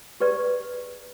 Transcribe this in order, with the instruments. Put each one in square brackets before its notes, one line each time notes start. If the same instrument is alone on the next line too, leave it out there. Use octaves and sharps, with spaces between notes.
[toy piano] G4 G#4 B4 D5